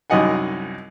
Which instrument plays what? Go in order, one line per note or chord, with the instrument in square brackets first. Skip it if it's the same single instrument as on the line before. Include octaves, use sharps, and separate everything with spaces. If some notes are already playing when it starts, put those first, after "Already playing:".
[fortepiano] C2 F#2 D#4 D#5 F#5 G#5